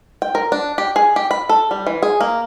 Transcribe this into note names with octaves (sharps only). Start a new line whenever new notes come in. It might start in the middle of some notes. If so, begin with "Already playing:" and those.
G5
A#4
D4
G4
G#4
G4
B5
A4
G3
E3
G#4
A#3